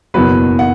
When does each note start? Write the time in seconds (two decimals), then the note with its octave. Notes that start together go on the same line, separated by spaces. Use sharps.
0.14 F#1 E2 B2 F#3 B3 B4
0.59 F#5